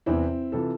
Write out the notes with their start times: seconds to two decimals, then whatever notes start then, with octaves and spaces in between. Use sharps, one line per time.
0.06 E2 C3 E3 C4 E4
0.52 C3 E3 F4 A4